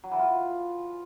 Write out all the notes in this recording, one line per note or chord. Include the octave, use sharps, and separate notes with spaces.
F#3
E3
F4